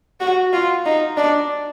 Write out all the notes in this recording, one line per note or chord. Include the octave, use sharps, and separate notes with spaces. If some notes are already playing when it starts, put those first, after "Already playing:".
F#4
F4
D#4
D4